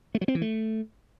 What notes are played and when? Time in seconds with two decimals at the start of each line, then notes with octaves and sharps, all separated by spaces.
0.15 A3
0.21 F#3
0.28 C4
0.35 E3
0.42 A3